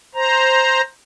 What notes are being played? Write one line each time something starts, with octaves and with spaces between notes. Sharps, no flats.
C5 A#5